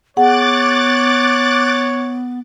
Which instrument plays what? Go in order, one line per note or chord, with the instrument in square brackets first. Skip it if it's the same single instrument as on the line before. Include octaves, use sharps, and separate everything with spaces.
[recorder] B3 [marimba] G#4 F#5 [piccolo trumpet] C#5 [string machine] D6 F#6 A6